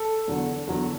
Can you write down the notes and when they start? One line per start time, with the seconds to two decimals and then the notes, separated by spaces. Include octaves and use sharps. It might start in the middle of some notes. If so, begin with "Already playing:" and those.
Already playing: A4
0.28 E2 D3 F#3
0.67 E2 D3 F#3